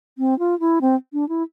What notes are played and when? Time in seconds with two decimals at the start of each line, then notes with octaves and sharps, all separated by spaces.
0.18 C4
0.39 F4
0.60 E4
0.81 C4
1.13 D4
1.29 E4